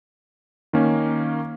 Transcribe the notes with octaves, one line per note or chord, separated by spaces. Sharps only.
D#3 A#3 C#4